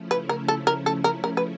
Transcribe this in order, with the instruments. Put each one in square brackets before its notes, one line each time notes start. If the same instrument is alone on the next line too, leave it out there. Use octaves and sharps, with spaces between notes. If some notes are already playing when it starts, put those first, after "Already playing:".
Already playing: [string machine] C#3 F3 A3 C#4 E4
[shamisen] B4
A#4
A4
A#4
A4
A#4
A#4
B4